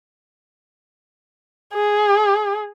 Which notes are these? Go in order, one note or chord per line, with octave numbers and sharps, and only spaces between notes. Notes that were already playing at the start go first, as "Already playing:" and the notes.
G#4